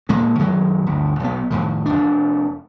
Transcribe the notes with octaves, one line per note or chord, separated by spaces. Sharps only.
A#2 G#3 A#3
F#2 D#3 F#3 G#3
G1 D2
B1 B3
F2 A2 D#3
F1 D4